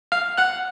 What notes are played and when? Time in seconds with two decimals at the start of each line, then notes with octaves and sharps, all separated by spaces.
0.12 F5 F6
0.37 F#5 F#6